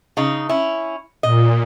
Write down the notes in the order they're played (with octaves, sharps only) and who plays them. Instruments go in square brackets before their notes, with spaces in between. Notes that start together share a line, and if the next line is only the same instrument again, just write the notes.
[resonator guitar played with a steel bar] C#3 D#4
C#4 E4
[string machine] A#2 [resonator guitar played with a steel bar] D#5